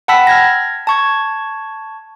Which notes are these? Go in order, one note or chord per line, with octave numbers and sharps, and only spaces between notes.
F#5 G5 A5 B5 E6 B6
F6 G#6 A#6
A5 C#6 G#6